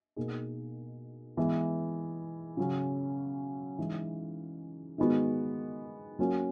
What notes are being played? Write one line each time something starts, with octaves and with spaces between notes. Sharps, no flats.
B2 A#3 D#4 G#4
E3 G#3 B3
C#3 F#3 C#4
E3 G#3 D#4
D#3 G#3 B3 F#4
F#3 A#3 C#4 F#4